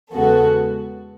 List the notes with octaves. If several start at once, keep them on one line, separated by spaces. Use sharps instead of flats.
E2 C#3 G#3 B3 F#4 A4